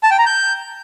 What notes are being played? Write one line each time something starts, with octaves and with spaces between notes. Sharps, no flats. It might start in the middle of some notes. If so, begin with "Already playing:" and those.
A5
G5
A#5
G6